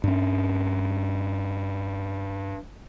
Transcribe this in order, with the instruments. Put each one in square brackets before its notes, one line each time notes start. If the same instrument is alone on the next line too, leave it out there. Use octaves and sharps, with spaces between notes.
[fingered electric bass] G2 C#4